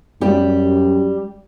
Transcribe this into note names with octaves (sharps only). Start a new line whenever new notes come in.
F#2 G3 G4